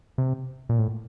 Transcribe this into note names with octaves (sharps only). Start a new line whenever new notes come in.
C3
A#2
A2